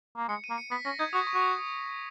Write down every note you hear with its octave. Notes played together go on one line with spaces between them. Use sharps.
A#3
G#3 C#7
D#7
A#3
C#7
B3 B6
C#4 A#6
D#4 G#6
F#4 D#6
C#6
F#4
D#6